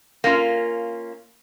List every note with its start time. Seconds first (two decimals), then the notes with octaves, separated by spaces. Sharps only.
0.24 A#3 C#4 F4